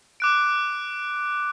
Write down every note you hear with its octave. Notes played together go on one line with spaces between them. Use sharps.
D6 F#6 D7